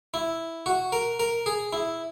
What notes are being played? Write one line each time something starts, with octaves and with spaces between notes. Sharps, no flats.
E4
F#4
A#4
A#4
G#4
E4